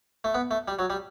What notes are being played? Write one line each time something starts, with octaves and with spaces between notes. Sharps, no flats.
A3
B3
A3
G3
F#3
G3